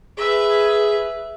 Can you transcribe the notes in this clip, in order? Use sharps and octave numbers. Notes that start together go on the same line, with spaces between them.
G#4 B4 E5